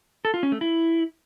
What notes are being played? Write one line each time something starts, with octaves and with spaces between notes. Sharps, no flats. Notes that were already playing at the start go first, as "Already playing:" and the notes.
A4
F4
C#4
A3
E4